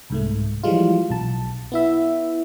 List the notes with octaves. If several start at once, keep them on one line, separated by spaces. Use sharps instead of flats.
C2 G#2 A3
E3 F3 G3 G#3 F4
B1 A5
B3 E4 E5